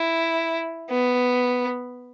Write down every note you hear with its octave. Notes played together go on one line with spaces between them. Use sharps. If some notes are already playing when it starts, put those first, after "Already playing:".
Already playing: E4
B3